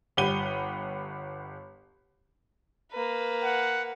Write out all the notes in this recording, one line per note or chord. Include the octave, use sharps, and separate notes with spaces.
G1 G4 F#5 B5 D#7 G7
A#3 B4
F#5